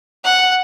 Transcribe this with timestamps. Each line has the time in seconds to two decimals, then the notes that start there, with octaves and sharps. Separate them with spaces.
0.25 F#5